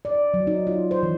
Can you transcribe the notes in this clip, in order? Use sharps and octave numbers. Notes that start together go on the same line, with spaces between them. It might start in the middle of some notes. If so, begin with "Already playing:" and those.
D5
F#3
D#4
F4
C5
E3